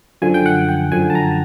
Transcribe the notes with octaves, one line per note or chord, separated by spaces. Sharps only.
F#2 D3 F3 G#5
G5
F#5
G5
F#2 D3 F3 G#5
A5
A#5